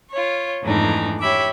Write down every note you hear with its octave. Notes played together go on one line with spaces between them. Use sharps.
F4 C#5
F2 G#2 E3 A3 D4 D#4
G4 C#5 E5 B5 D6